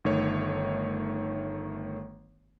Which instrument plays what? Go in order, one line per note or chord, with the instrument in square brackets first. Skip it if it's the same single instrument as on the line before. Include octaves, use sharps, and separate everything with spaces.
[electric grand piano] G1 D#3 A3 C#5